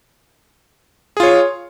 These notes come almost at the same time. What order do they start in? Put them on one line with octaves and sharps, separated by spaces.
G#4 F4 C#5